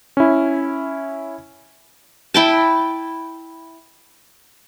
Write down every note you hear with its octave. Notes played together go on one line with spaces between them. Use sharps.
C#4 E4
E4 G5 A5